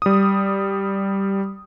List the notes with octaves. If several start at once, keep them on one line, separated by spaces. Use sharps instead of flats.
G3 D#6